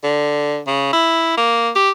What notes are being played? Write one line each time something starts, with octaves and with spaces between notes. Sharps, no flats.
D3
C#3
E4
A#3
G4